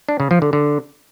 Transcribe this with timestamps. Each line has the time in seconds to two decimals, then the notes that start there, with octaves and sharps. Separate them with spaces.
0.09 D4
0.20 C#3
0.31 F3
0.42 D3
0.53 D3